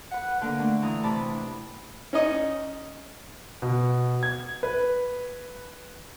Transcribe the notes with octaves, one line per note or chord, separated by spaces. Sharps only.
B4 F#5
D3 A#3
A3 D4
E3 A#5 D#6
C3 A5 B5 D6
D4
C#4 D#4 D#5
B2
G#6
B4